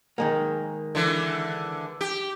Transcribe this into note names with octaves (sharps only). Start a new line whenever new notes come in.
D#3 G#3 A#3
D3 E3
G4